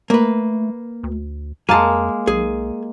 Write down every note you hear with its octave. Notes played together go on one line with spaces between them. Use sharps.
A3 A#3 B4
D2
F2 G#3 A#3 G#5 A5
B1 G#4